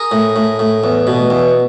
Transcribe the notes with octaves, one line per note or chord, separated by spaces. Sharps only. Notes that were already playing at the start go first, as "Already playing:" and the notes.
Already playing: G#4 A#4
A2
A2
A2
E2
B2
E2